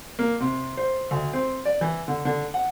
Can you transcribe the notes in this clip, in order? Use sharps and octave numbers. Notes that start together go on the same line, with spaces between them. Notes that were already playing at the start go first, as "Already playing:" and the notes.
A#3
C3
C5
D2
C4
D5
E3
D3
D3
F#5